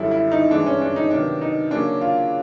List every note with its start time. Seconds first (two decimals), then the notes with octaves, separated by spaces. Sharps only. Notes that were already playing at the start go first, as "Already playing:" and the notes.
Already playing: F#2 D3 G3 E4
0.11 E4
0.31 D#4
0.51 G2 E3 G#3 D4
0.66 C#4
0.81 D4
0.96 D#4
1.11 C3 D#3 F#3 B3 D4
1.41 D#4
1.71 C#3 F#3 A#3 C#4 D4
2.01 F4